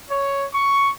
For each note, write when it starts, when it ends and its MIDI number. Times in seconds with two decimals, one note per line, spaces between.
0.11 0.46 73
0.53 0.91 85